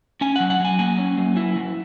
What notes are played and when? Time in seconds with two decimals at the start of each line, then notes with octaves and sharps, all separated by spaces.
0.21 C#4 G#5
0.36 F#3 F#5
0.50 F#5
0.60 F#3 G#5
0.79 A#3 G#5
0.98 C#4
1.18 F#3
1.37 E4
1.56 F#3